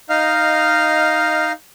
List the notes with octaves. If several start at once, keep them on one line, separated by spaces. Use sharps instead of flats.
D#4 D#5 F5 F6